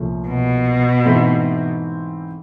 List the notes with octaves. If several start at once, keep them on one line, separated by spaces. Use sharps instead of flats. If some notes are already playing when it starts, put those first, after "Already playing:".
Already playing: C2 A#2 F3 A3 C#4
B2
G#2 E3 A3 C4 E4